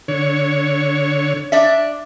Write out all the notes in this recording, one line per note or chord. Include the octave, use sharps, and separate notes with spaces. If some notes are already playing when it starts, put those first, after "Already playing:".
D3 C#5
D4 D5 E5